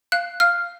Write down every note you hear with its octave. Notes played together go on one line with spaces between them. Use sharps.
F5 F#6
F5 F6